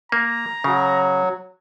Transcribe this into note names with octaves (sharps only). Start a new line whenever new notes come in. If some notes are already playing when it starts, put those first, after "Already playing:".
A#3 A#5
C#3 F#3